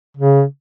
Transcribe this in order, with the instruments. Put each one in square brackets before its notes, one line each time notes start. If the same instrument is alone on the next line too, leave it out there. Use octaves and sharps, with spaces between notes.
[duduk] C#3